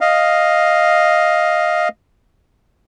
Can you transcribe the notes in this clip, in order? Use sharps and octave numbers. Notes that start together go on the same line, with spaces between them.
D#5 F5